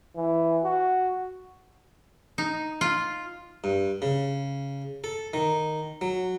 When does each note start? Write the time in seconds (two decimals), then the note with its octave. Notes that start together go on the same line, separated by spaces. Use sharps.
0.16 E3
0.64 F#4
2.38 D#4
2.81 F4
3.64 G2
4.02 C#3
5.04 A4
5.33 D#3
6.01 F#3